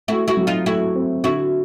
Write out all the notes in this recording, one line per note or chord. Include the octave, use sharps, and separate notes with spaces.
A3 E4 F#4
E4 F#4
F#3
D#4 F4
A3 E4 F#4
C4
D3 E4 F#4